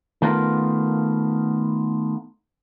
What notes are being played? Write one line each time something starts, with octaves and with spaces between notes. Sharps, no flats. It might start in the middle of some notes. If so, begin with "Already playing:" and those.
D#3 A3 B3 F4 A#4